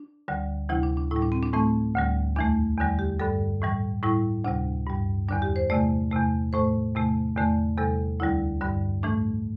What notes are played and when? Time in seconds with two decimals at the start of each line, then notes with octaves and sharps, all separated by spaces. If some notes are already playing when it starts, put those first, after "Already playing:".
Already playing: D4
0.28 D2 D3 G3
0.69 D2 C3 E3 G3 E4
0.83 D4
0.97 D4
1.11 A2 G3 E4
1.22 D4
1.32 C4
1.42 D4
1.53 A2 E3 A3 C4
1.94 D2 D3 G3
2.36 E2 E3 A3 D4
2.77 E2 D3 G3
2.99 G4
3.19 G2 D3 G3 A4
3.62 A2 E3 G3
4.03 A2 G3 E4
4.44 D2 C3 G3 D4
4.87 G2 G3
5.28 E2 D3 G3 D4
5.42 G4
5.56 C5
5.70 E2 C3 A3 D5
6.11 E2 C3 A3
6.53 A2 A3 C5
6.95 E2 C3 A3
7.37 E2 D3 A3
7.78 E2 C3 G3 A4
8.20 D2 D3 G3 E4
8.61 G2 D3 G3
9.03 A2 E3 A3 D4